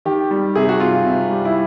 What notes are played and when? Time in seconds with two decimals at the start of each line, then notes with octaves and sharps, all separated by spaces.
0.05 D#3 G4
0.31 G3
0.55 C3 G#4
0.69 F#4
0.80 C3 F4
1.04 C3
1.30 G3
1.45 E4